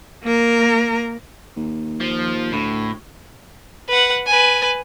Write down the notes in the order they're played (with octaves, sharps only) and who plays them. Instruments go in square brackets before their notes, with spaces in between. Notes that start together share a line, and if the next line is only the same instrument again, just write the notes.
[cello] A#3 A#4
[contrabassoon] D#2
[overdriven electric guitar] F3
[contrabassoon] D2 [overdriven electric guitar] A2
[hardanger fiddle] B4 F#5
B4 G#5